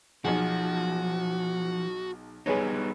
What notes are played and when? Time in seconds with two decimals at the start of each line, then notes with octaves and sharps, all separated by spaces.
0.25 B1 F3 F#4 G#4
2.46 G3 B3 D#4 G#4 B4 C#5